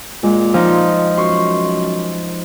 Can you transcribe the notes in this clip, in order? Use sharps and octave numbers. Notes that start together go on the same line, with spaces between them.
A#2 G#3
F3 D#4
F#2 C6 C#6